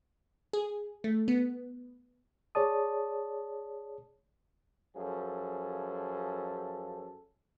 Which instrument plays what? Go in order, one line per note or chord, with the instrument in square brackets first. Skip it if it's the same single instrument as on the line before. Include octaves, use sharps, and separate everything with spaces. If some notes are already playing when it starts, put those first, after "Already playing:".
[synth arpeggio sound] G#4
A3
B3
[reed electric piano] G#4 C#5 D5 A5 D#6
[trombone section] F#2 F3 G#4 A4